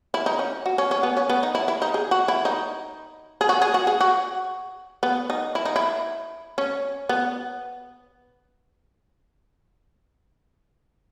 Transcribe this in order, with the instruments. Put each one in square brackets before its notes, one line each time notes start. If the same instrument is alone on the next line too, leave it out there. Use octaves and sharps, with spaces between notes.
[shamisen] E4
D#4
C#4
F#4
C#4
C#4
B3
C#4
B3
D#4
E4
E4
D#4
G#4
F#4
E4
D#4
G#4
F#4
G#4
F#4
G#4
F#4
B3
D#4
E4
D#4
E4
C#4
B3